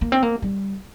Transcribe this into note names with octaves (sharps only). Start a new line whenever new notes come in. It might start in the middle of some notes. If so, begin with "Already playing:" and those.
A#3
C4
A#3
G3